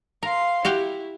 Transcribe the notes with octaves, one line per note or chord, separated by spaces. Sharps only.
A#4 F5 C6
E4 F#4 G4 F5 G5